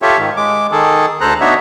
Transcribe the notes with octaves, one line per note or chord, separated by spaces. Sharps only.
F4 G4 A4 C#5 E5
G#2 D#3
G#3 D6
D#3 G#4 A4
D2 A4 C5 A#5 F#6
B3 D4 D#4 F#4 C#5 E5